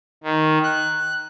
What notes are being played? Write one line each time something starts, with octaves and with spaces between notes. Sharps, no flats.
D#3
F#6